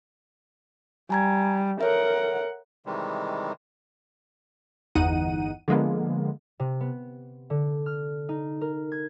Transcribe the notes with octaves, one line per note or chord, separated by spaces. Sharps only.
G3 G#5 A#5 G#6
A4 A#4 C#5 E5 F#5
C3 D#3 E3 G3 G#3
G1 E2 D#4 F#5 D#7
D3 F3 G#3 A#3 B3
C3
B3
D3
F6
D#4
A#4
G#6